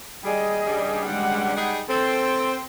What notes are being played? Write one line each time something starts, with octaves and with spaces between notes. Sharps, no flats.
G3 G#4 D#5
G2 C#3 G3
G#3 F#5
G3 D#4 G#4
C4 A4